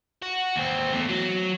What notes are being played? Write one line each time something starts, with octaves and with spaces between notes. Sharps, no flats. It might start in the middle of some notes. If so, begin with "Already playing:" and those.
F#4
D#2 C4
E2 A2
F#3